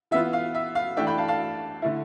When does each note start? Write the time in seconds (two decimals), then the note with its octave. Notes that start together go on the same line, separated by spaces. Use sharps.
0.11 E3 B3 F4 E5
0.33 F5
0.55 E5
0.75 F5
0.97 E3 A3 D4 E5 G5
1.07 G5 B5
1.18 F5 A5
1.28 F5 A5
1.82 D3 A3 E4